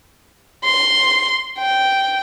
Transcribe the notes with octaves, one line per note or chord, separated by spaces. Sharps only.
C6
G5